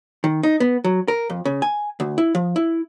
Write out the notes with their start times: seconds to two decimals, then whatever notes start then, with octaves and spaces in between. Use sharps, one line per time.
0.24 D#3
0.43 D#4
0.60 B3
0.84 F#3
1.08 A#4
1.30 F2
1.45 C#3
1.62 G#5
2.00 D2
2.18 E4
2.35 F3
2.56 E4